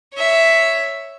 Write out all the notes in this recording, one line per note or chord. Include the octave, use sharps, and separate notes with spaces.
C#5 E5